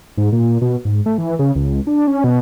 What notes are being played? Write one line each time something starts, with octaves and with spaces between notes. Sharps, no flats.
G#2
A#2
B2
G#2
A3
E3
C#3
C#2
D4
C#4
B2